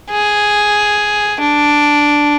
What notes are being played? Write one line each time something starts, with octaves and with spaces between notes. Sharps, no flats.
G#4
D4